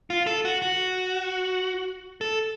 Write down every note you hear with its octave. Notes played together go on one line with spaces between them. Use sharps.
F4
A4
F#4
F#4
A4